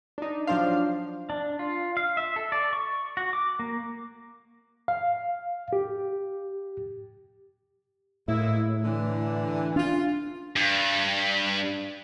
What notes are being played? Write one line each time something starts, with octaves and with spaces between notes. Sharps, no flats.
D4 D#4
F3 F#3 D4 C5 F5
D4
F4
F5
E5
A4
D5
C#6
F#4
D6
A#3
F5
G4
A2 G#3 A#3 E4
D3 E3
D4 F4
G2